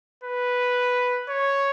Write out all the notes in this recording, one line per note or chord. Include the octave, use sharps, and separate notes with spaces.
B4
C#5